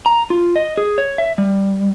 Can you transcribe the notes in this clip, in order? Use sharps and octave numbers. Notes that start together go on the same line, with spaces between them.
A#5
F4
D#5
G#4
C#5
E5
G3